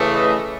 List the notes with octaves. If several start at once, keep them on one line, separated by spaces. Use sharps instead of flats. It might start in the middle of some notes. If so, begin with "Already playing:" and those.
Already playing: C#3 E3 A3
B4 D#5